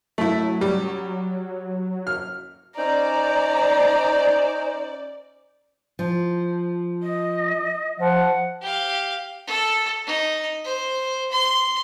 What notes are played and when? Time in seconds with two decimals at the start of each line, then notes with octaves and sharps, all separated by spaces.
0.18 F#3 A3 E4
0.61 G3
2.07 F6
2.77 C#4 D#4 C5 D5 A#5
5.99 F3
7.03 D#5
8.00 F3 F#5
8.62 G4 F5
9.47 A4
10.06 D#4
10.64 C5
11.32 C6